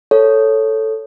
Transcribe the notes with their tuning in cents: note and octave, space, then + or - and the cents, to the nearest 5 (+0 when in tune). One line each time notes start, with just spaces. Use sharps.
A4 +0 C#5 +0